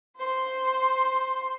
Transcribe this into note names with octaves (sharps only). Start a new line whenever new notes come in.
C5 C6